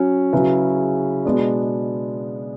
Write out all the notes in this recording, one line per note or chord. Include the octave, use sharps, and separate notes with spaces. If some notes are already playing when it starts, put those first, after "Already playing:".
Already playing: F#3 C#4 F#4
C#3 F#3 C#4 E4 B4
B2 G#3 B3 D4